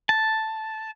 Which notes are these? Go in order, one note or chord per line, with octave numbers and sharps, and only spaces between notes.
A5